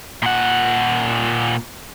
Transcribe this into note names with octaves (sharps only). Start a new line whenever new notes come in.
A#2 F#5